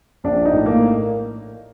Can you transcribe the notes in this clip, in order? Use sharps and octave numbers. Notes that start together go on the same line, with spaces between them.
A#1 D4
D#4
A2
A#3